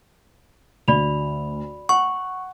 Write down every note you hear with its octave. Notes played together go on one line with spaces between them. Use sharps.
D2 D5 B5 F7
F#5 C#6